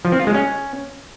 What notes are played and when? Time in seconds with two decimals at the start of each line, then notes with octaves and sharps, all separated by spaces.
0.05 F3
0.12 C4
0.20 F4
0.27 G#3
0.34 C#4